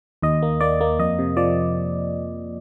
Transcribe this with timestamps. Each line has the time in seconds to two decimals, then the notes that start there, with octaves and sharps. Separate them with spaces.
0.22 D#2 D#5
0.42 A#3
0.60 A#3 D5
0.81 A#3
0.99 F2 D#5
1.19 C3
1.37 F3 D5